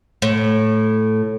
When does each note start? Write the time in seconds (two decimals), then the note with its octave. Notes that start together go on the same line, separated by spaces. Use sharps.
0.22 A2